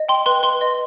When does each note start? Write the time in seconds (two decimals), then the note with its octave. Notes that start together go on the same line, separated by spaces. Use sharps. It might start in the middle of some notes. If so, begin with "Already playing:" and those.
Already playing: D#5
0.09 G5 C6
0.26 B4 C6
0.43 B4 C6
0.61 D#5